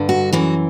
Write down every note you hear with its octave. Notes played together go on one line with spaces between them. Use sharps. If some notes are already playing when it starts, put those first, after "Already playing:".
Already playing: G2 D3
F#4
F#2 E3 F#4